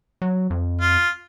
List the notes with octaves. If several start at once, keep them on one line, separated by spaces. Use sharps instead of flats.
F#3
F2
F4